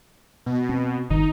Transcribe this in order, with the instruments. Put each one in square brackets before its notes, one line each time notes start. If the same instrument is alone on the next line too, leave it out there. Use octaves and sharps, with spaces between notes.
[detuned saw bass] B2
[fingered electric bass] C4
[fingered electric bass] G1 D#3 [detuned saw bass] D#4